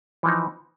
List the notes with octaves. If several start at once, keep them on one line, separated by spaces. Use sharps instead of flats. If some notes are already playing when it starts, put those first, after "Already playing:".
E3 F3 D#4